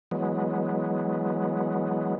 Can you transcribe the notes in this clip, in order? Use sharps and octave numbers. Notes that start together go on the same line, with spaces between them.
E3 F#3 G#3 B3